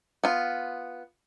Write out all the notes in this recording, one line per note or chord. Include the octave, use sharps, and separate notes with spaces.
B3 F4